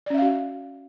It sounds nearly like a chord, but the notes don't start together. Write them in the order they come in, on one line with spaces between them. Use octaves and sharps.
D5 C#4 E5 F5 F#4